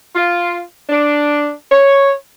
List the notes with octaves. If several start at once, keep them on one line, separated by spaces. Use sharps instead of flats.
F4
D4
C#5